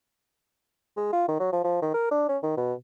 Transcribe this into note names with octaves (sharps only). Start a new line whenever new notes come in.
G#3
F4
D#3
F#3
F3
F3
D#3
A#4
D4
C#4
D#3
B2